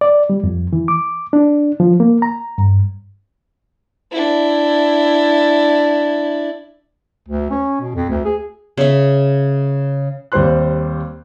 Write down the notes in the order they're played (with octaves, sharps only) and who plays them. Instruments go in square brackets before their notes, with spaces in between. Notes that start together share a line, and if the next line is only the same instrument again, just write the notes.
[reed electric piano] D5
G3
F2
E3
D6
D4
F3
A#3
A#5
G2
[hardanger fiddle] D4 E4
[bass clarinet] D2
C#4
B2
F2
D2
G#4
[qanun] C#3 E5
[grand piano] D#2 G3 C4 C5 C6 F#6